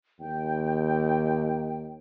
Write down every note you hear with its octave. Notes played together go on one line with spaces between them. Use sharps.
D#2 G5